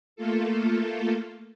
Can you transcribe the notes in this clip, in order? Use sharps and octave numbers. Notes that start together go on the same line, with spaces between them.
A3 A#3 F4 A4